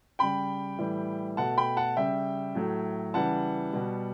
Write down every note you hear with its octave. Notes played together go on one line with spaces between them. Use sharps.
C#3 G3 G5 B5
A2 E3 G3
B2 A3 F#5 A5
G5 B5
F#5 A5
C#3 G3 E5 G5
A2 F#3 A3
C#3 E3 G3 F#5 A5
B2 G3